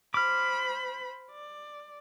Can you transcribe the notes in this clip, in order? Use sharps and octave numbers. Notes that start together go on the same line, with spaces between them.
C5 B5 D6 F6
D5